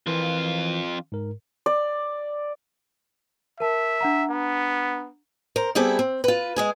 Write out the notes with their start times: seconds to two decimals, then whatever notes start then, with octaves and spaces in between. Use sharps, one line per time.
0.07 F2 E3 F4 A#4 B4
1.12 G#2 A#4
1.66 D5
3.60 A#4 E5 A5
4.01 D4 F#5 A#5
4.30 B3
5.56 A#4 C5
5.75 G3 B3 C4 E4 G#4 A4
5.99 C4
6.24 F4 B4
6.56 G#3 G#4 G#5